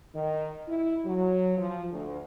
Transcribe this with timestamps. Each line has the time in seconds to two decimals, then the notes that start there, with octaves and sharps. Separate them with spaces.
0.15 D#3
0.68 E4
1.05 F#3
1.58 F3
1.92 D2